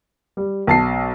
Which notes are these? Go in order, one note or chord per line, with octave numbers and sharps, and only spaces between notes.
G3
B1 A5 C7